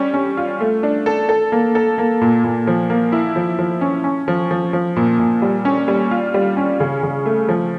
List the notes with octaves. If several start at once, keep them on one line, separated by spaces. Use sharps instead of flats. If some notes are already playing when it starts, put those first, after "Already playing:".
Already playing: G3 C#4
C#4
F4
A3
D4
A4
A4
A#3
A4
A#3
A#2
A#2
F3
A#3
E4
F3
F3
C#4
C#4
F3
F3
F3
A#2
A#2
G3
C#4
G3
F4
G3
C#4
C#3
C#3
A3
F3